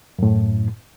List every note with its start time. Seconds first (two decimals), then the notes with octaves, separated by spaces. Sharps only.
0.19 F#2 A2